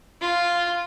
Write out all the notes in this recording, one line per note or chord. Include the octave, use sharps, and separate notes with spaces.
F4